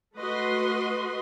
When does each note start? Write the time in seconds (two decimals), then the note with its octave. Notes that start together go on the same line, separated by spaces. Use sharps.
0.17 A3 F#4 B4 D#5 C6